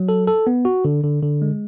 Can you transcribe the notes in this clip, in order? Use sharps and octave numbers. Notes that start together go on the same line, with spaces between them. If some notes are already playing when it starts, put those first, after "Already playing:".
Already playing: F#3
A4
A4
B3
F#4
D3
D3
D3
G#3